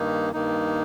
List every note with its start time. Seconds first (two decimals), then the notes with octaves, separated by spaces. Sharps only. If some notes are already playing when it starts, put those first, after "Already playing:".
Already playing: G2 D#3 A#3 D#4
0.33 G2 D#3 A#3 D#4